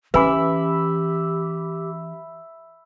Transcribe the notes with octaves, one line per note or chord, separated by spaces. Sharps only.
E3 C#4 G4 B4 E5 G#5 B5 D6